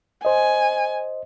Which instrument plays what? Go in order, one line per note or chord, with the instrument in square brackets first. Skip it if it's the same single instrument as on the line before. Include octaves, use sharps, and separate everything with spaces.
[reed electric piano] C5 D#5 [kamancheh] G#5